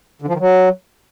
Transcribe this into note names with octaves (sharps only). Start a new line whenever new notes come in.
D3
F3
D#3
F#3